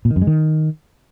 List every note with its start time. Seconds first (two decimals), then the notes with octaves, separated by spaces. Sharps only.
0.05 A#2
0.11 D#3
0.16 F#2
0.22 G#3
0.27 D#3